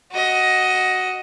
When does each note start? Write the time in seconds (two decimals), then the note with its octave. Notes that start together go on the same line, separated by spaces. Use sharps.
0.13 F#4 D#5